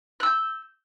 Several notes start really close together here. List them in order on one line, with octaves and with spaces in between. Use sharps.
F#6 E6 G6